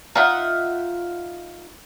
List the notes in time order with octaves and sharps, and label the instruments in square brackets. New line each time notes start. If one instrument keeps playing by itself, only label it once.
[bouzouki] D#4 F4 E5 F#5